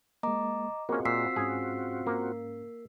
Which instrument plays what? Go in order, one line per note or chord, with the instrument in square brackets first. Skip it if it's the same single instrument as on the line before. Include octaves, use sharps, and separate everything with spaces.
[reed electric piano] G#3 A#3 [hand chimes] D#5 A#5 D6
[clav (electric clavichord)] A#3 C#4 [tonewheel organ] C4 F4 F#4 [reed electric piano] G#4 A#4 D#5
[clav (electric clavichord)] A#2 [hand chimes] E6 B6 C7
[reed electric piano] G#2 C#4 [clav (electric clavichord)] G#4
[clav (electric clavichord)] A#3